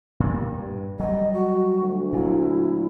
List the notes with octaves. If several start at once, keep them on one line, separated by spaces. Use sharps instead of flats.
G2 A#2
G2
F#3 G3 D#5
F#4
D2
A#2 F#3 E4